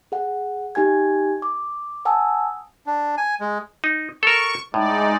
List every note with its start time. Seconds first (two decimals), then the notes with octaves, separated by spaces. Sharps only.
0.12 G#4 F#5
0.75 D#4 G4 G#5 G#6
1.42 D6
2.05 F#5 G#5 A5 D#6 E6
2.86 D4
3.18 G#5
3.40 G#3
3.84 D#4
4.23 A4 A#4 C#6
4.74 A2 G#3 D#4 D5